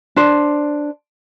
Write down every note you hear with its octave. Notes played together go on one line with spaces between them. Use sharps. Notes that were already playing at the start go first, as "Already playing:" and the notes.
D4 C5